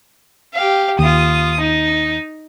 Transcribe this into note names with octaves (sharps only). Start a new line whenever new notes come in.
G4 F5
D#2 F4 D#6
D#4